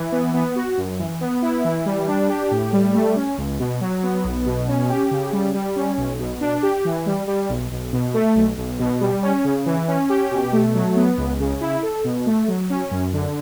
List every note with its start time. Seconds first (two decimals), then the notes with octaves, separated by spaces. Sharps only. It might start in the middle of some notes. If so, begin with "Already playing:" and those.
Already playing: E3
0.12 B3
0.34 B3
0.56 F#4
0.77 F#2
0.99 E3
1.21 B3
1.42 E4
1.64 E3
1.86 G3
2.08 D4
2.29 G4
2.51 A2
2.73 G3
2.94 A3
3.16 C#4
3.37 C#2
3.59 B2
3.81 F#3
4.03 B3
4.24 B1
4.46 B2
4.68 C#4
4.89 G4
5.11 C#3
5.33 G3
5.54 G3
5.76 C#4
5.97 B1
6.19 B2
6.41 D4
6.63 G4
6.85 E3
7.06 G3
7.27 G3
7.49 B1
7.71 B1
7.93 B2
8.14 A3
8.36 B1
8.57 B1
8.79 B2
9.01 G3
9.23 C#4
9.44 C#3
9.66 E3
9.88 C#4
10.09 G4
10.31 B2
10.53 A3
10.74 F#3
10.96 B3
11.18 C#2
11.40 C#3
11.61 E4
11.83 A4
12.04 B2
12.26 A3
12.48 F#3
12.70 C#4
12.91 F#2
13.13 D3